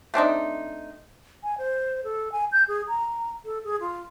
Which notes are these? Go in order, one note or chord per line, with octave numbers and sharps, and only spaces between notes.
A3 C4 D4 D#4
G#5
C5
A4
G#5
G6
G#4
A#5
A4
G#4
F4